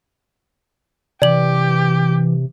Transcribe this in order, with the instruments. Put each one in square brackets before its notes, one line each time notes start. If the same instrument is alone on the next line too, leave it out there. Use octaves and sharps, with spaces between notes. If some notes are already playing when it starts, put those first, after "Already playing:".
[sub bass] C3 [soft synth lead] E3 [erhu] G4 [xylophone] D5 F#7